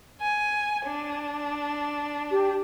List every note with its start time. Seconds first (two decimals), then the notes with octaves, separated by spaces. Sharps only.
0.22 G#5
0.86 D4
2.31 G4